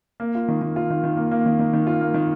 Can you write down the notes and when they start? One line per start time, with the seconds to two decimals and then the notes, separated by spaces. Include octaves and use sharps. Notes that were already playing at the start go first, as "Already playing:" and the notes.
0.20 A#3
0.35 F4
0.48 D#3
0.61 D#3
0.76 F4
0.90 D#3
1.04 D#3
1.17 A#3
1.31 A#3
1.46 D#3
1.59 D#3
1.73 D#3
1.87 F4
2.01 A#3
2.14 D#3